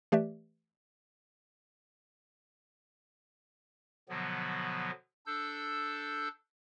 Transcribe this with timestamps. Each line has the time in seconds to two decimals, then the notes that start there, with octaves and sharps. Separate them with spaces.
0.12 E3 A3 G4 B4 D5 E5
4.09 B2 D3 F3 F#3 B3
5.27 D4 A4 E6 G6